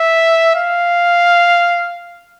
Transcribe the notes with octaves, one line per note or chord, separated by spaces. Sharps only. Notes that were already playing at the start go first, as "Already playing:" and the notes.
Already playing: E5
F5